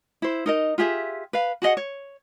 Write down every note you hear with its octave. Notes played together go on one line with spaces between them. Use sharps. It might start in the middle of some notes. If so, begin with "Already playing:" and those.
E4 C5
D#4 A#4 D#5
F4 G4 G#4 E5
B4 F5
F#4 G#4 D#5 F#5
C#5